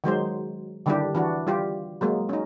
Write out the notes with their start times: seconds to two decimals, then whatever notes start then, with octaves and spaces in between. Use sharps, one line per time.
0.04 D#3 F#3 G#3 C5
0.86 D3 D#3 G3 D4 E4 G4
1.15 E3 D4 F#4
1.47 G3 F4 G4
2.01 F#3 G#3 A#3
2.29 C#4 D#4